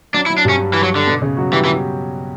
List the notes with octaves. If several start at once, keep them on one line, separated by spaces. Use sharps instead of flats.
F#3 D4
E4
F#3
D4
G2 G3 C#4
E3
F#3
D3
B2 B3
C#3 C#4
F#3 F#4
E3 G3 G4
E3